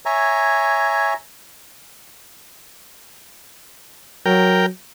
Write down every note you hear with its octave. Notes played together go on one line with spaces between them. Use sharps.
C#5 E5 G#5 A#5
F#3 A#4 G5